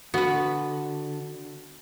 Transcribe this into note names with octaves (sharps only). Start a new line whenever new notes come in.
D3 B3 F#4 B4